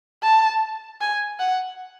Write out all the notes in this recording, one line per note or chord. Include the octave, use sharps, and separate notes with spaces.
A5
G#5
F#5